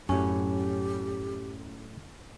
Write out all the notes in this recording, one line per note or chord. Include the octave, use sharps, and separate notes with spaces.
F#2 A2 F#3 C#4 G4